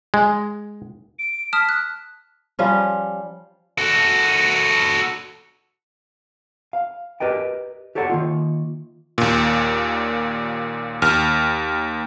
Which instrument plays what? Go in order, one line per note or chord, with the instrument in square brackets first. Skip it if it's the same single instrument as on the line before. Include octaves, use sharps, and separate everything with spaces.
[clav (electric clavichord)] G#3
[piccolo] D7
[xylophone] A5 D#6 F6 [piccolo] B6
[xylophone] F#6
[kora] F3 G3 C#4
[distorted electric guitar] F#4 A4
[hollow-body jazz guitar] F5
G4 A#4 B4 D5 D#5 G5
G4 A4 C#5 D5 F#5
D#3 A#3 F4
[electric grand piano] D#2 A#2
D#2 F6